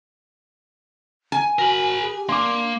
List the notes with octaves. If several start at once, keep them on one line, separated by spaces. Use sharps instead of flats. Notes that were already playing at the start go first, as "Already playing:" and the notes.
G#5
F#4 A#4 B5
G#4
G4
A#3 D4 C6 D6